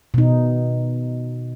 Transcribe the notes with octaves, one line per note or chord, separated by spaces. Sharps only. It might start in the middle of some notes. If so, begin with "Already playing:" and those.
B2 D#4